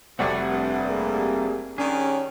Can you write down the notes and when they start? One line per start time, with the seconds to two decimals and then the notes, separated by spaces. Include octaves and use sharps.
0.19 F1 G3 A3 C4 F#4 D5 F#5
0.50 G2
0.87 A#3 G#4
1.78 D#3 G3 C#4 D4 G#4